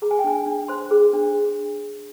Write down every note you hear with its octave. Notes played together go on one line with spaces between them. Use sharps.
G#4 A#5
G#5
G5
D4 G#5
D4
C5 C6
G#4
D4